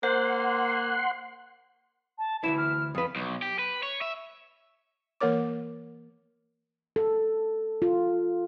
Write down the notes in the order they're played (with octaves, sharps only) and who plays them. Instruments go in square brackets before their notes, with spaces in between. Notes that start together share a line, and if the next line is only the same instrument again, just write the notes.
[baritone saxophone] A#3 [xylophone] C5 [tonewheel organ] F#5 C6
[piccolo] A5
[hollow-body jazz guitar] D2 E3 E4 [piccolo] E7
[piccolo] F6
[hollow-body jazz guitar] F2 B4 [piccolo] D#6
[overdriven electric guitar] B1
G4
B4
C#5
E5
[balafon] E3 A#3 A#4 C#5 D6
[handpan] A4
F4